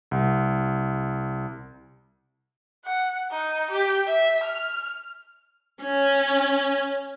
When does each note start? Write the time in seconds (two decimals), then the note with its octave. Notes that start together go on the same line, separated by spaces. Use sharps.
0.11 C2
2.85 F#5
3.31 D#4
3.71 G4
4.07 E5
4.43 F6
5.82 C#4